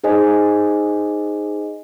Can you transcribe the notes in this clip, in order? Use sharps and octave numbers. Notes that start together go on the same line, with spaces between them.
D#4 G#4 C5 D#5 G#5